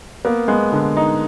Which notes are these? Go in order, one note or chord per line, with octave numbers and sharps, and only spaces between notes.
A#3 B3
G#3 B3
D3
D#4